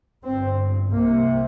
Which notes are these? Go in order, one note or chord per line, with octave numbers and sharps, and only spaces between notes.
G1 G2 C4
C2 C3 A#3